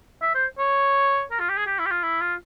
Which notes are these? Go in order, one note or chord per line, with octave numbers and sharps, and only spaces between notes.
E5
C5
C#5
A#4
F4
G4
G#4
G4
E4
G4
F4
E4
F4